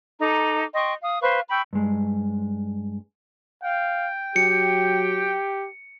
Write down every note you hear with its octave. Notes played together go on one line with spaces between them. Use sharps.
D#4 A4 A#5 D6
D#5 G5 C6 C#6
F5 D#6
B4 C5 F5 C#6
G5 B5 C#6 E6
G2 G#3
F5 G5
F#3 G4 C#7